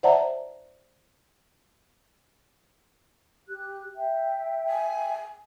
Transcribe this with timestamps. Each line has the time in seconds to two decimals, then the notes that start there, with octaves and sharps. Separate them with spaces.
0.03 C5 D5 E5 F#5 A5 A#5
3.48 G4 F#6
3.95 E5 G5
4.69 G#5